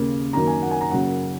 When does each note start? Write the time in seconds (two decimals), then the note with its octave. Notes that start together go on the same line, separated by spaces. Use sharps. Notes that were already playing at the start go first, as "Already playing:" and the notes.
Already playing: D#2 C#3 A#3
0.33 F#2 D#3 F#3 A#3 A#5
0.47 G#5
0.62 F#5
0.71 G#5
0.81 A#5
0.91 F#2 C#3 F#3 A#3 F#5